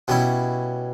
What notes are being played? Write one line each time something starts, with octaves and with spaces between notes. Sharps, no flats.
B2 G3 C#4 E4